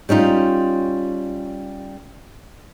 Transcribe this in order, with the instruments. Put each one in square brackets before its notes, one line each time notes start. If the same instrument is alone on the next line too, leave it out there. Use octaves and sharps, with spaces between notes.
[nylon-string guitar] G3 C#4 D#4 F4